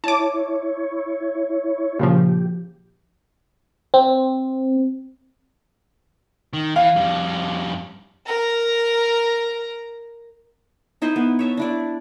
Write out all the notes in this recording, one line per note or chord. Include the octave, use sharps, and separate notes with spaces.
E4 C#5 A5 D6
A#2 C#3 F3 G4
C4
D#3
E3 F5
F2 G3
A#4 A#5
D#4 E4 C5 D#5
B3
C#5 E5 A5
D4 E4 D5